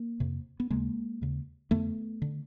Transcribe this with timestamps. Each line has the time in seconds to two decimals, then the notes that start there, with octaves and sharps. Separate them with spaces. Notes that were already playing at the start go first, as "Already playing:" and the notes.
Already playing: A#3
0.20 F2 C3
0.60 B3
0.70 D#2 C#3 G#3 A#3
1.22 D#2 C#3
1.71 F2 D3 A3 B3
2.22 D3